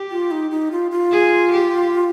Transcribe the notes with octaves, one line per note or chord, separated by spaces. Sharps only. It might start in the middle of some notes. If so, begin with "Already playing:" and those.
Already playing: G4
F4
D#4
D#4
F4
F4
G#4
G4